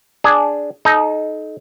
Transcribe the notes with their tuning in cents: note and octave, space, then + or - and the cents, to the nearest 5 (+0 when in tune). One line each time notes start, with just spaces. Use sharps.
D4 +0 G#4 +0
D#4 +0 A4 -35